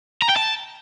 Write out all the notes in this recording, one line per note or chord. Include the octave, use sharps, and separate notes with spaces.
A#5
G5
A5